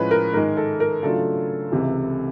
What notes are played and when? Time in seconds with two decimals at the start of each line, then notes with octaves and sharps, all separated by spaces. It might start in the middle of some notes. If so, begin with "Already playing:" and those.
Already playing: A2 F3 G#3 C#4 B4
0.11 A#4
0.33 G#2 D#3 G#3 A#4
0.57 A4
0.80 A#4
1.03 C#3 F#3 A3 D4 F4 A4
1.72 C#2 C3 E3